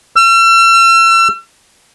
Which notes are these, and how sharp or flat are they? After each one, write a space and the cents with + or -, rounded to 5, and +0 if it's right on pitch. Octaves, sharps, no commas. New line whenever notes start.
E6 +40